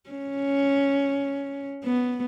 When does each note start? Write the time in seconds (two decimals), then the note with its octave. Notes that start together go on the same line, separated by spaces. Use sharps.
0.10 C#4
1.84 B3